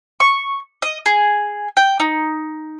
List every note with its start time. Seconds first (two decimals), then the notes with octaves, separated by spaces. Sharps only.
0.20 C#6
0.82 D#5
1.06 G#4
1.77 G5
2.00 D#4